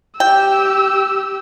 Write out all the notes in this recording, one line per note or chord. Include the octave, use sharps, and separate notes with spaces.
G4 G5 E6